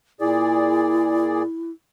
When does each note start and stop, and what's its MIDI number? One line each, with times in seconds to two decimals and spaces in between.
0.20 1.42 46
0.20 1.71 64
0.20 1.42 68
0.20 1.42 74